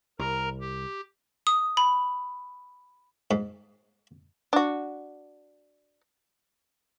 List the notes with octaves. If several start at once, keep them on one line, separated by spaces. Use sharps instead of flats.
C2 A#4 A#5
G4
D#6
B5
G#2
D4 F#4